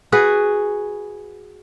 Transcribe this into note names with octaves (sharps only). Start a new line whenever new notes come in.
F#4 G#4 B4